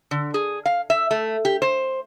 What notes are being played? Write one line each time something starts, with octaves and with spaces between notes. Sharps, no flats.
D3
G#4
F5
E5
A3
G4
C5